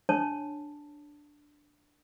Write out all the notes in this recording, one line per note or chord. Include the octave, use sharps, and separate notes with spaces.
D4 C#5 A5